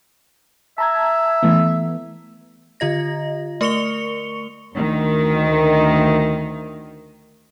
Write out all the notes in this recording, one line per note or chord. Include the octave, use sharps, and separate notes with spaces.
E5 A5 A#5 G#6
E3 A3 B3
D3 F4 D#5 A#6
A3 A#4 C#6 C#7 F7 G7
D2 D#3